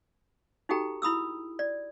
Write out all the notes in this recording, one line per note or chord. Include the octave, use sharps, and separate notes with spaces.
D#4 F#4 G4 A4 G5 A#5
E4 B5 D#6 E6
D5